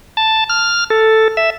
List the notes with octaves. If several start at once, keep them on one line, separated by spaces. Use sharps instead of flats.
A5
F6
A4
E5